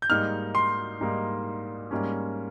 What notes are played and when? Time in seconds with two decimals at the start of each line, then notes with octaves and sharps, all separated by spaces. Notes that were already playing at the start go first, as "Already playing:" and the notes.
0.02 G6
0.10 G#2 G3 A#3 D#4 F6
0.55 C6
1.01 G#2 G3 A#3 D#4
1.91 G#2 G3 A#3 C#4